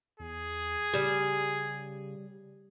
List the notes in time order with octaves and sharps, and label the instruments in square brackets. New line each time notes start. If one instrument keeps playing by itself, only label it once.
[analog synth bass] E2 [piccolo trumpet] G#4
[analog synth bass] C#3 [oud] G3